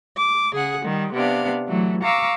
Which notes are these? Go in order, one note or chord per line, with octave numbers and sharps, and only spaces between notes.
D6
C#3 G#4 F#5
D#3 G3
C3 B3 D4 F5
E3 F#3 A3
F5 A#5 C#6 D6 E6